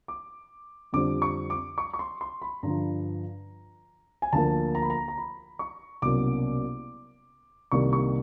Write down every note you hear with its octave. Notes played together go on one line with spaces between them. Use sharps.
D6
F2 D3 G3 C4 D6
C#6
D6
C#6
C#6
C6
C6
B5
G2 D3 F3 A#5
G#5
D2 D3 F3 A#3 A5
A#5
B5
A#5
A#5
B5
C#6
C2 B2 F#3 A#3 C#4 D6
C2 C3 D#3 G3 A#3 C#6
C#6